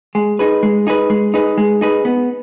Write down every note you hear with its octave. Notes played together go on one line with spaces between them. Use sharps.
G#3
D#4 G#4 B4
G#3
D#4 G#4 B4
G#3
D#4 G#4 B4
G#3
D#4 G#4 B4
B3